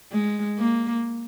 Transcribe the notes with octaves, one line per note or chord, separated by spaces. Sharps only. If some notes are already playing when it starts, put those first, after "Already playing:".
G#3
A#3